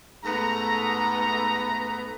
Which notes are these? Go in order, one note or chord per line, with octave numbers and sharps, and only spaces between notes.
G#2 A3 B3 A#5